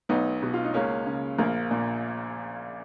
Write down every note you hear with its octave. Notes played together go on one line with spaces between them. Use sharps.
B1 B3 D#4
B2
F4
D#4
C#2 A#3 C#4
C#3
A#1 A#3
A#2